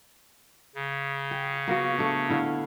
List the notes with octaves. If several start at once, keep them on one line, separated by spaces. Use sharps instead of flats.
C#3
G5
A#3 B3 F#4
A3 D4
D3 E4 F5